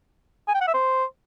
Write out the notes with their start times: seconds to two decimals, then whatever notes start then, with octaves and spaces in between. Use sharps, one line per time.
0.48 G#5
0.55 G5
0.61 F#5
0.68 E5
0.74 C5